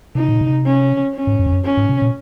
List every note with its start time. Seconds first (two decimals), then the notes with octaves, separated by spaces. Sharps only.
0.15 C3 D#4
0.29 A#2
0.41 C3
0.65 C#4
1.15 C#4
1.27 G#2
1.39 F#2
1.46 F2
1.52 F#2
1.65 C#4
1.77 G#2
1.89 C3
2.02 A#2